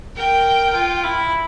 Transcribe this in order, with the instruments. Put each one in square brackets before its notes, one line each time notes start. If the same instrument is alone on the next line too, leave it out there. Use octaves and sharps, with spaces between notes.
[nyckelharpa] A#4 [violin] G5
[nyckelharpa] F4
E4